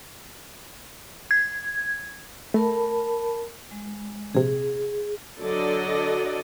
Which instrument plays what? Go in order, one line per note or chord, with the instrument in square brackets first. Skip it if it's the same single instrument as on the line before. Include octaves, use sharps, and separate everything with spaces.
[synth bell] G#6
[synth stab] A3 [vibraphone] A#4 A5 B5
[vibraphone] G#3
[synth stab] A#1 C3 [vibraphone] G#4
[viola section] D3 F#3 A4 D5 D#5